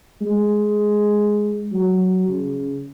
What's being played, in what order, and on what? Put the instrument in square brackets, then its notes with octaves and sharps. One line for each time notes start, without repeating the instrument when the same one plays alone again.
[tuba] G#3
F#3
C#3